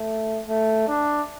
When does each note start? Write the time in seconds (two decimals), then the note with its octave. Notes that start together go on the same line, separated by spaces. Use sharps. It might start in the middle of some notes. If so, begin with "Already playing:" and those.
Already playing: A3
0.49 A3
0.88 D4